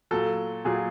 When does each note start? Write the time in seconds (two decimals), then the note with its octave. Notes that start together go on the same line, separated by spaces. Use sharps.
0.11 A#2 F#3 A4
0.65 A#2 F#3 G#4